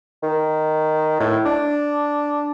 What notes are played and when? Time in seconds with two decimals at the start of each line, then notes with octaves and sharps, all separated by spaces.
0.23 D#3
1.20 A2
1.46 D4